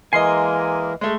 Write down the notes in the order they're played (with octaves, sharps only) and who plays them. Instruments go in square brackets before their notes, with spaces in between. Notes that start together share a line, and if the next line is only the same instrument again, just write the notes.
[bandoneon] E3 [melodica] G#3 A#3 A#4 [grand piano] D#5 C7 [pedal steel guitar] G#5 C6
[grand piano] G#3 A3